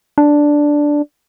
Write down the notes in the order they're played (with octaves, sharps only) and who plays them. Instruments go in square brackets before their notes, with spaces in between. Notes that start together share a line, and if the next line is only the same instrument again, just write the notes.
[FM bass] D4